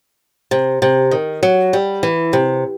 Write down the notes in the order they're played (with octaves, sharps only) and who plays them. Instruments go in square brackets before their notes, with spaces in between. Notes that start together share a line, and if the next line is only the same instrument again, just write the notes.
[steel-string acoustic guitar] C3
C3
D#3
F#3
G3
E3
C3